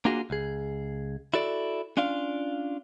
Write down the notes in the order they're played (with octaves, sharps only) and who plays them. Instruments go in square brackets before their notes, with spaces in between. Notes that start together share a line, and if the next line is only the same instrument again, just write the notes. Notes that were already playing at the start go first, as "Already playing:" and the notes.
[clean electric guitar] A#3 D4 F4 F#4 G#4
C#2 G#4
E4 F#4 A4 D5
C#4 D4 F4 D5 F5